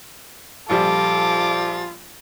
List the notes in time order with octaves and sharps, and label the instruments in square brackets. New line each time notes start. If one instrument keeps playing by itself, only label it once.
[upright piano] A#1 F3 G3 [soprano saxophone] F4 [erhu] A4 [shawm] D6